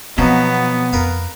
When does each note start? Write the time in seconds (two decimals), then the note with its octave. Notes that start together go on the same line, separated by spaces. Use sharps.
0.18 B2 F3 F#3 B3 C4 D#4
0.93 F2 A#4 B4 F5